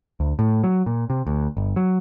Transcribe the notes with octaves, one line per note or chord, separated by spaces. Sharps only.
D2
A2
F#3
A#2
C3
D2
G1
F#3